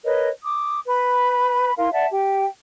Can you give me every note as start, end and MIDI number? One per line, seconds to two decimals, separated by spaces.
0.04 0.28 70
0.04 0.28 71
0.04 0.28 73
0.04 0.28 75
0.43 0.78 86
0.43 0.78 87
0.87 1.73 71
0.87 1.73 83
1.78 1.92 64
1.78 1.92 70
1.78 1.92 77
1.78 1.92 84
1.92 2.06 74
1.92 2.06 76
1.92 2.06 78
1.92 2.06 81
2.11 2.45 67
2.11 2.45 79